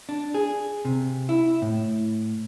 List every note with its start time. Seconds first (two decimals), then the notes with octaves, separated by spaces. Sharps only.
0.09 D4
0.34 G#4
0.85 C3
1.29 E4
1.62 A2